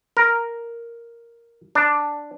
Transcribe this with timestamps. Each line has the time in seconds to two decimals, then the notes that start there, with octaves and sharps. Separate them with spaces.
0.17 A#4
1.75 D4